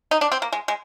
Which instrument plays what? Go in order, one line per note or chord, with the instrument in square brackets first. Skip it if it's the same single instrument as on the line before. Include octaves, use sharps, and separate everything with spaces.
[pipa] D#4
D4
C4
A#3
G#3
G#3